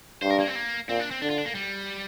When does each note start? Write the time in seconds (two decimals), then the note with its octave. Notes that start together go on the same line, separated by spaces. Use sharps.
0.22 G2 C5
0.30 A#4
0.40 A#3
0.48 C4
0.55 A#3
0.89 A#2 C4
1.00 D4
1.11 C4
1.22 D3 D4
1.30 F4
1.38 D4
1.46 A#3
1.55 G3